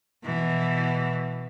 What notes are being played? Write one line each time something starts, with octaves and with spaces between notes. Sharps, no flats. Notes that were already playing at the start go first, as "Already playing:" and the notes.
B2 E3